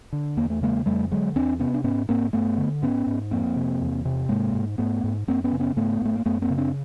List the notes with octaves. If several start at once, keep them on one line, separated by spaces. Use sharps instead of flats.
D3
E2 A#3
A3
C#3 G#3 A#3
F2 G3 A3
D3 F#3 G#3
E2 C4 D4
C3 B3 C#4
D4
G#2 B3 C#4
G#2 A#3 C4
G2 A3 B3
D3
G#2 B3 C#4
G#2
F2 A#3 C4
C3
E2
C3
G#2 G#3 A#3
G#2
G#2 A3 B3
G#2
F#2 A#3 C4
B3 C#4
C#3
B3 C#4
G#2 A3 B3
G#2 A3
A#3
F#2 A3 B3
A#3 C4
C#3
C4 D4